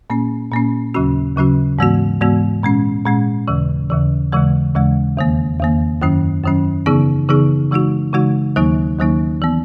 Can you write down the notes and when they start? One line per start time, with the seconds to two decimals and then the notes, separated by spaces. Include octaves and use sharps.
0.10 A#2 A#3 C#4
0.52 A#2 A#3 C#4
0.94 D#2 C#3 F#3 C#4 F#4
1.37 D#2 C#3 F#3 C#4 F#4
1.79 G#2 E3 G#3 B3 F#4
2.21 G#2 E3 G#3 B3 F#4
2.63 A#2 G#3 C#4
3.06 A#2 G#3 C#4
3.48 D#2 C#3 E3
3.90 D#2 C#3 E3
4.32 D#2 C#3 E3 G#3
4.75 D#2 C#3 E3 G#3
5.17 E2 D#3 A#3
5.59 E2 D#3 A#3
6.02 F#2 D#3 F#3 C#4
6.44 F#2 D#3 F#3 C#4
6.86 C#3 E3 B3 D#4 G#4
7.29 C#3 E3 B3 D#4 G#4
7.71 C#3 E3 G#3 D#4 F#4
8.13 C#3 E3 G#3 D#4 F#4
8.56 D#2 D#3 F#3 A#3 D#4
8.98 D#2 D#3 F#3 A#3 D#4
9.42 E3 B3